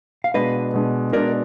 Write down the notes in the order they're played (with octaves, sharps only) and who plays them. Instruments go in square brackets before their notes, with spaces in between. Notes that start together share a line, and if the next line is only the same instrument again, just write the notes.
[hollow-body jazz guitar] F5
[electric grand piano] B2 G#3 D4 [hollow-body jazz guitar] B4 D#5
[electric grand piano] B2 G#3 D4
[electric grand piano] B2 G#3 D4 [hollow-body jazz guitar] A#4 D5